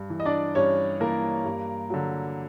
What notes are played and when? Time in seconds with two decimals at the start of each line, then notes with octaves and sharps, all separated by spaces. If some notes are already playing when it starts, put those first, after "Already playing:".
Already playing: G2
0.10 E3
0.20 D#5
0.25 D4 D5
0.55 G2 C#4 C#5
1.00 E3 A#3 A#4
1.45 G2
1.90 D3 F#3